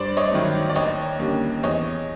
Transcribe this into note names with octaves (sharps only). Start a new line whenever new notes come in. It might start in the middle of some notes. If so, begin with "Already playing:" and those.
Already playing: G2 C5 D5
C#5 D#5
D#3 F#3 A3
D5
D#2 C#5 D#5
D3 G3 A#3 C#4
E2 C#5 D#5